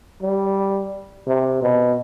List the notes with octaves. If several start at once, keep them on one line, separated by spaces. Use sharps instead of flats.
G3
C3
B2